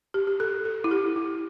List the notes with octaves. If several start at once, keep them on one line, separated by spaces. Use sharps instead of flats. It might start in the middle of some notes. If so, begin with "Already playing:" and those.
G4
G4
A4
A4
E4
G4
E4